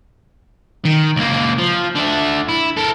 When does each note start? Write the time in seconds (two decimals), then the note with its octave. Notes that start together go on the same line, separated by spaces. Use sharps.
0.85 D#3
1.16 C#2 A#3
1.58 F3
1.95 D3 E5
2.49 E4
2.77 A4 A#4